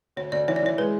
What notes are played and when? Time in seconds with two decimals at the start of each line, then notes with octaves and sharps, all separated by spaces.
0.16 D2 C#5
0.32 D2 D5
0.48 E3 C#5
0.56 D5
0.63 E3 C#5
0.78 G#3 B4